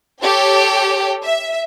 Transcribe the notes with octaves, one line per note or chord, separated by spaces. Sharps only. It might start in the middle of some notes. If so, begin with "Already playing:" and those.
G4 A4 C#5 G5
E5